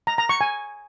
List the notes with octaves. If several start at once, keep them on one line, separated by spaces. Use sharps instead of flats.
A#5
A#5
C#6
G#5